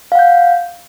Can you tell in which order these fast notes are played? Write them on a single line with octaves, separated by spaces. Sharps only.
F5 F#5 G6